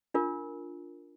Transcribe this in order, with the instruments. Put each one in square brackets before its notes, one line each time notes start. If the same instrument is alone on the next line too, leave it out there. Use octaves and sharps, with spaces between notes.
[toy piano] D4 F4 A#4